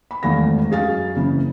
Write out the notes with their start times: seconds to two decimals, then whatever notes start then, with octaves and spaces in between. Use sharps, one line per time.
0.11 B5
0.23 D#1 G#1 E2 A3 F5 A#6
0.70 F#2 G#4 F5 A6
1.15 F#1 C#3 E3